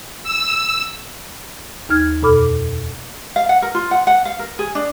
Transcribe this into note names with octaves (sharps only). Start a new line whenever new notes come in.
E6
D#2 D#4 F6 G#6
F2 B2 A4 B5 D6 F6
F5
F#5
A#4
F4
F#5
F#5
F5
A#4
G#4
D4